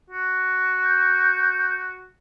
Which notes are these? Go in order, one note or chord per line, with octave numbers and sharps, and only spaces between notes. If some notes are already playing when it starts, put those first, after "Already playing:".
F#4
G6